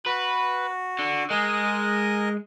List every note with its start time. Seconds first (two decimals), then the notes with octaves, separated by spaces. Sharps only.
0.06 F#4 B4
0.99 D3
1.30 G#3 A#4 D#5 G#5